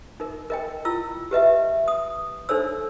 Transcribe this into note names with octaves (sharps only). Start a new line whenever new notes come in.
D#4 A#4
A#4 D#5 G5
E4 F4 E6
G4 B4 D#5 E5
D#6
D4 D#4 A4 C5 C#5 E6